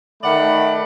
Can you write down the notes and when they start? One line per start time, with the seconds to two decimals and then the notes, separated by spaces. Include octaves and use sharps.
0.23 D#3 A3 D5 F#5 B5